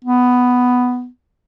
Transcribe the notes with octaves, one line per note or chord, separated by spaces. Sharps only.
B3